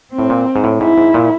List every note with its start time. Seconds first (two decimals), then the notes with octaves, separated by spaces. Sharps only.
0.13 C4
0.19 A2
0.30 A#2
0.56 G#2
0.64 A2
0.81 G#2 E4
0.98 G#2
1.14 A#2